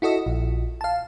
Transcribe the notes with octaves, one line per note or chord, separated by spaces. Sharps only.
E4 F#4 A4 D#5
A#1
F5 A5